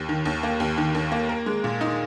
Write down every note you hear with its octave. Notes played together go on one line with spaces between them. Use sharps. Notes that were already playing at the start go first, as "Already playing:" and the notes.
Already playing: D#2
D#3
D#2
A#3
D#2
D#3
D#2
A#3
A#4
G#3
A#2
D#4